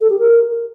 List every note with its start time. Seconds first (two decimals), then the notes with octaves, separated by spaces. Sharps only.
0.01 A4
0.10 G4
0.19 A#4